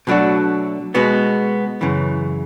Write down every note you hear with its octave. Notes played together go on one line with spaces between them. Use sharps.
B2 F#3 A3 D4 F#4
B2 G#3 B3 F#4
F#2 C#3 E3